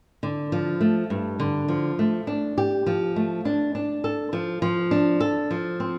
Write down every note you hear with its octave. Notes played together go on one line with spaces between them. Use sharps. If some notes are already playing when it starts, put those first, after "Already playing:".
D3
F3
A3
G2
D3
F3
A3
D4
G4
F3
A3
D4
D4
A4
F3
F3
D4
A4
F3
C4